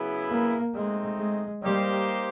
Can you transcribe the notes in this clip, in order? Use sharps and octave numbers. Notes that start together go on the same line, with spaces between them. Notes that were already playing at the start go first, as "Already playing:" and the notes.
Already playing: C#3 F#3 B3 E4 G#4
A#3
G#3 A3 C4 D#4
G#3
G3 A#3 D#4 G4 C5